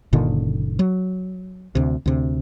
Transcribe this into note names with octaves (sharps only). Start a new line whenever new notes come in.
F#1 A#2 D3 D#3
F#3
D2 C3
D2 C3